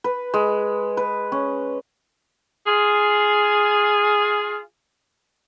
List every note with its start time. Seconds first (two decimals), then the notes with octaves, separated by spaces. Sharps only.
0.04 B4
0.34 G#3
0.97 B4
1.32 C#4
2.66 F4 G#4